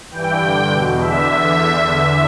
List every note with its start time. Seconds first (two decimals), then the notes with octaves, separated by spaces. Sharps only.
0.11 G2 E3 G5
0.40 G2 D3
0.71 E2 B2
1.00 E2 D3 E5